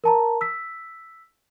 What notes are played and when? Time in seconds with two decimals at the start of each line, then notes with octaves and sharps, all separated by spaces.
0.04 A#4 A5 A#5
0.41 E6 B6